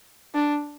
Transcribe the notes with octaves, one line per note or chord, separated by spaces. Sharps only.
D4